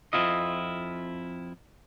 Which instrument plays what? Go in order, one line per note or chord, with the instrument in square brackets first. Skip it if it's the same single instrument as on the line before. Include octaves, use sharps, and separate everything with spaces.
[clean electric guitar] F2 F3 C4 E4 F4 D#5